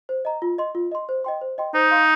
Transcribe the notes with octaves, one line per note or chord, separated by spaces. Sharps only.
C5
D#5 A#5
F4
D#5 C6
F4
D#5 C6
C5
D#5 G5 C6
C5
D#5 G5 C6
D#4 C5
F5 C6